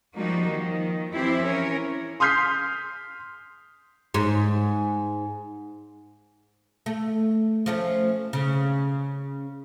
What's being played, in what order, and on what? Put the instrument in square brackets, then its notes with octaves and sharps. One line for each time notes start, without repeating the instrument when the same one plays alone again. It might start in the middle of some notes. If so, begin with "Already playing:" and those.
[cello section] F3 G3 A#3 D#4 F#4
D#3 F3
E3 F3 C4 E4 G4 C5
C#4 A#4 C#5
[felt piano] C6 D#6 F6 G6 B6 C7
[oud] G#2
A3
F3 A3 C#4
C#3